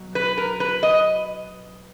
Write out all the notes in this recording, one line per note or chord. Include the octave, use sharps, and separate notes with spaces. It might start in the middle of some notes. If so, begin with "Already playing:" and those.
Already playing: B2 F#3
B4
A#4
B4
D#5